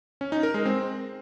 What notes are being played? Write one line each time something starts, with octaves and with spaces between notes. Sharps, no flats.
C#4
D#4
A#4
G#3
C4